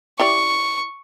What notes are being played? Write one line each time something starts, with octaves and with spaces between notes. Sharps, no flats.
E4 G4 D5 C#6